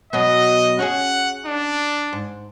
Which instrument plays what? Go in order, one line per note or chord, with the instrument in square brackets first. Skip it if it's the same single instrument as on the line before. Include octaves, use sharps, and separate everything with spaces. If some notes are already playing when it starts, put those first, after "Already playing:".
[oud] B2 F#3 B3 [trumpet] D#5
[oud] C#4 F#4 G#4 [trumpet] F#5
[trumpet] D4
[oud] G#2